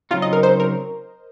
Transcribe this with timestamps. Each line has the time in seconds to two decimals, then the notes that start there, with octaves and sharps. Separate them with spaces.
0.11 C#3 F#3 C4 D#4 F4
0.22 D#5
0.33 A#4
0.43 C5
0.60 A#4